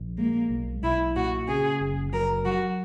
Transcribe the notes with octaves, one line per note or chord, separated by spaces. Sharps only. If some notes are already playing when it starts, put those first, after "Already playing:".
Already playing: A#1
G#3 A#3
B1
B1 E4
A#2 F#4
C#3 G#4
F#1
F#3 A#4
F#3 F#4